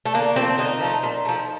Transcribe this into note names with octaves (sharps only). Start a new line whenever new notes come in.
A3
D3 A#3
F3 A3 C4
D3 D#4
F3 A3
A#2
F3 A3